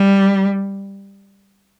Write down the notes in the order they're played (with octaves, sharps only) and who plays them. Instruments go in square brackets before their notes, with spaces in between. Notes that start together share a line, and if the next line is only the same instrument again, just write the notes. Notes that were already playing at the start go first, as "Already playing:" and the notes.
Already playing: [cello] G3